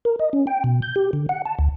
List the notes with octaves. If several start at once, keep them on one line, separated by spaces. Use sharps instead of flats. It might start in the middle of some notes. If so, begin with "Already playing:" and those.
A#4
D#5
C#4
G5
B2
G6
G4
D3
F#5
A5
D2